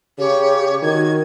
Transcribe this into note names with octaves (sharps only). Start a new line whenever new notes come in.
C#3 G4 C#5
D#3 F#4 G#6